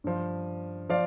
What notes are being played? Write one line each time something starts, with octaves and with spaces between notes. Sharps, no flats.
G2 F3
F3 D5 F5